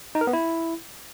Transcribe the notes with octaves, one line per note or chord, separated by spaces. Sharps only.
D#4
A#4
B3
E4